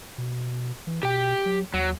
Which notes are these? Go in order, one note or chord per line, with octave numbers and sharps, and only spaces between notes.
B2
E3
B2 G4 G5
F#3
D#2 F#3